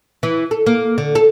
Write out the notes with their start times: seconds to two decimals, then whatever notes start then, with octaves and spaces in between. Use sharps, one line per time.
0.23 E3
0.51 A4
0.66 A#3
0.98 D3
1.15 A4